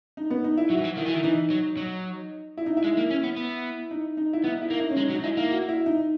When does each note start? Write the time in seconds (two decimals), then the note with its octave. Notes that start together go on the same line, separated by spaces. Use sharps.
0.17 D#4
0.30 B3
0.44 D#4
0.57 E4
0.70 F#3 F#4
0.78 E3
0.85 F#3
0.97 D#3 E4
1.06 E3
1.15 D#3
1.23 E3 D#4
1.50 F#3
1.77 F#3
2.57 E4
2.66 D#4
2.77 E4
2.84 G#3
2.97 A#3
3.11 C#4
3.23 B3
3.37 B3
3.91 D#4
4.17 D#4
4.33 E4
4.44 B3 D#4
4.61 E4
4.70 A#3
4.80 D#4
4.90 C#4
4.96 G#3 D#4
5.10 F#3
5.15 D#4
5.24 G#3 E4
5.37 A#3
5.51 F#4
5.69 E4
5.86 D#4